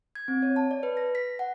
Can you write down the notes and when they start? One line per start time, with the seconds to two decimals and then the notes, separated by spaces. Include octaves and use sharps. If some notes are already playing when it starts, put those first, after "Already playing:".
0.15 G#6
0.28 C4
0.42 C#5
0.56 A5
0.71 D5
0.83 B4
0.97 A#6
1.15 B6
1.39 F#5